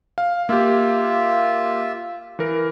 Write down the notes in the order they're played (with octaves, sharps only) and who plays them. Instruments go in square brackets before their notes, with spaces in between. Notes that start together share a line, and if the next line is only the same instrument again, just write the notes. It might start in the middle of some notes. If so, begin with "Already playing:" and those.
[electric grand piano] F5
[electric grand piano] A#3 G4 [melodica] F4 E5
[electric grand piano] E3 A#4